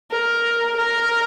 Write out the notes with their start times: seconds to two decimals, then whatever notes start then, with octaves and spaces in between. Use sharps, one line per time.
0.11 A#4
0.77 A#4